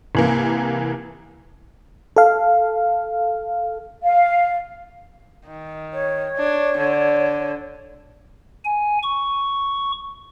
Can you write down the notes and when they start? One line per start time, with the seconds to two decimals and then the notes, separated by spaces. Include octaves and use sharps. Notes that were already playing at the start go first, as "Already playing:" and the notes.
0.15 C2 E3 A#3
2.16 A4 F5
4.03 F5
5.47 D#3
5.94 C#5
6.36 D4
6.78 D3
8.65 G#5
9.03 C#6